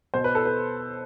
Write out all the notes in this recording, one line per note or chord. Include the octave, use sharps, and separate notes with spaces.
B2 C5
B4
A4
B4